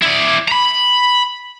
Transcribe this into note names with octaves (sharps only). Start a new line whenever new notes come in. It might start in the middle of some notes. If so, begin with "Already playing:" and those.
E4 D5
A#5 B5